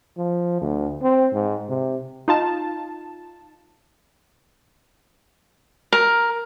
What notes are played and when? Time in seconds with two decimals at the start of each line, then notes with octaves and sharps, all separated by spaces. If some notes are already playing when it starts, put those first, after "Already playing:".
0.17 F3
0.62 D2
1.02 C4
1.33 G#2
1.69 C3
2.28 D#4 F4 A5
5.93 A#4